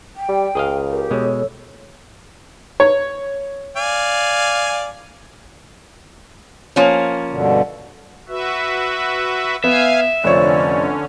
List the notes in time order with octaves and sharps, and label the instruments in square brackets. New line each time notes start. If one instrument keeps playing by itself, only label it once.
[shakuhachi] G5
[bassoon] G3
[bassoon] C#2 [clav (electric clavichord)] G#4 D#5 F5
[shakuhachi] G4 [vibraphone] A#4
[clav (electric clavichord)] B2 G#3 [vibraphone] A4 C#5 E6
[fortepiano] C#5
[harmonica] D5 F5 G#5
[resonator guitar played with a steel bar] F3 A#3 C#4
[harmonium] G2 B2 D3
[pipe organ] F#4 B4 E5
[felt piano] B3 [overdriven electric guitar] E5 [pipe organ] F5 G#5
[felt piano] F1 F3 C#5 [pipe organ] D3 C#4 [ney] D5